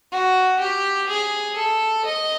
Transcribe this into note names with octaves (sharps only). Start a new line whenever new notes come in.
F#4
G4
G#4
A4
D#5